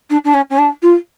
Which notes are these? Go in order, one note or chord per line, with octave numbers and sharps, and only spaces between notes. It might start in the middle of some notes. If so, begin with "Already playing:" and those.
D4
D4
C#4
C#4
D4
F4